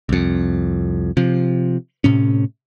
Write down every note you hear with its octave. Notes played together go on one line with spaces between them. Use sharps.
C2 F2
C3 F3
A2 C3 C#4